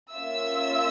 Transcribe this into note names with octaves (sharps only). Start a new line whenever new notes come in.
A#3 C#4 F4 E5 E6